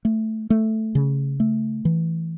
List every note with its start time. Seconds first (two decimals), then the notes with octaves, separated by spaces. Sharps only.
0.05 A3
0.50 A3
0.95 C#3
1.40 A3
1.85 E3